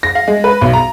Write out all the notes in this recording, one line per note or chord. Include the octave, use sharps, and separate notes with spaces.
A#6
F5
G#3
B4
B1
A#5